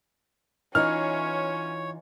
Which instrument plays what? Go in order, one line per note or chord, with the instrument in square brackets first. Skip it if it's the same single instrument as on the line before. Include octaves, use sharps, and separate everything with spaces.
[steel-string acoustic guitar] E3 D#4 F4 [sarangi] C#4 [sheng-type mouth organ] C#5 [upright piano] F6